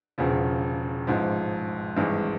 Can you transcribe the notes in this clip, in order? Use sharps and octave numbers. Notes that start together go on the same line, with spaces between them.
E1 E2 C#3 F3
A1 G#2 F3
G#1 G2 E3 G#3